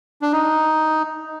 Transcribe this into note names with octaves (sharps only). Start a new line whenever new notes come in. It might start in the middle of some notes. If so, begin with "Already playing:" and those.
D4
D#4